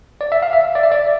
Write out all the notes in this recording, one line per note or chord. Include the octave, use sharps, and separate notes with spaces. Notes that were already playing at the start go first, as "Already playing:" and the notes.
D5
E5
F5
E5
D5
E5
D5